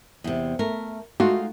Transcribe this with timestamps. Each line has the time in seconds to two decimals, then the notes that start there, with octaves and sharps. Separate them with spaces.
0.24 E2 C3
0.59 A3 A#4
1.20 G#3 A3 D#4 F4 F#4